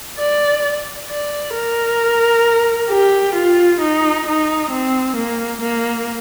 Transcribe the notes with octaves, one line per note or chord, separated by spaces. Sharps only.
D5
D5
A#4
G4
F4
D#4
D#4
C4
A#3
A#3